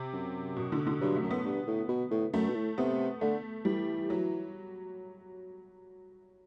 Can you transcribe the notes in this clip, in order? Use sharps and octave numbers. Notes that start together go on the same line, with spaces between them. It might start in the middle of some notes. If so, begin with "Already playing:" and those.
Already playing: C3
F#2
B2
D3
D3
G2 F#3
A3
F#2
B3
G2
A2
B2
A2
F#2 A3
B2
A2
C3 B3
D3 A3
E3 G3
F#3